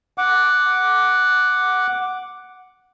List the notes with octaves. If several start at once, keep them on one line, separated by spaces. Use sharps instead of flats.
F#5 D6